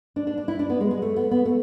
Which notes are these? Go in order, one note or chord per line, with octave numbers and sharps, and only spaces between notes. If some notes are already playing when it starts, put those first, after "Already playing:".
D4
D4
D4
E4
D4
B3
G#3
G#3
A3
B3
B3
A3